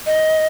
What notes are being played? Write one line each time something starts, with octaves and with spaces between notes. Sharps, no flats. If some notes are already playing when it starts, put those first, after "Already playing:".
D#5